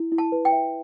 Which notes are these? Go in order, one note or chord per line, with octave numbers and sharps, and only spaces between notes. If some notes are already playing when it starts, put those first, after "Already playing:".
Already playing: E4
E4
A5
B4
G5
E5